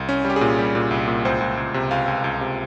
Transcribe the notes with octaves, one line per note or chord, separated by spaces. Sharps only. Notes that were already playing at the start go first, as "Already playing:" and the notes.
Already playing: C2
C#4
G3
G4
G#4
A#2
G3
A#2
C2
A#2
C#2 C5
C#2
C#2
C3
C#2 F5
C#2
C#2
C3